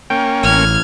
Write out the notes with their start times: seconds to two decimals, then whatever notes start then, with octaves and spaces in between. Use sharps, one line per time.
0.10 A#3 C#4 G5
0.43 A1 F6 G#6